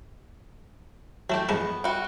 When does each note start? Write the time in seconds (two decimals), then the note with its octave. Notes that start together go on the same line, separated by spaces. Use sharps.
1.30 F#3 A3 E4 G4
1.49 F2 G#3 B3 E4
1.84 G3 F#4